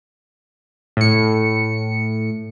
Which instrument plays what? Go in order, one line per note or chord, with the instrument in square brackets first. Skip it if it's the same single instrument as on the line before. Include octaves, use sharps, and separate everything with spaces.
[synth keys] A2 C#7